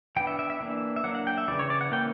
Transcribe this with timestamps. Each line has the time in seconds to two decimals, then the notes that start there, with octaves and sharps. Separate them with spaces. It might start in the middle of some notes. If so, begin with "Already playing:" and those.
0.16 E3 B3 D4 G5
0.27 E5
0.39 E5
0.50 E5
0.61 E3 A#3 D4
0.96 E5
1.04 F#3 A#3 D4 F#5
1.15 F#5
1.27 G5
1.38 E5
1.48 C#3 E3 G3 D5
1.59 C#5
1.70 D5
1.81 F#5
1.92 E3 A#3 C#4 G5